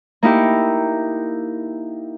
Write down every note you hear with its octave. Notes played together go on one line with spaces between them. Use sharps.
A#3 D#4 E4 G4